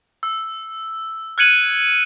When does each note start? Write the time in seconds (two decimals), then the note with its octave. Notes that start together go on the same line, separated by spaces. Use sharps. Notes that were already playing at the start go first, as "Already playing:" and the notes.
0.23 E6
1.38 F6 F#6 G#6 C#7 D#7 F#7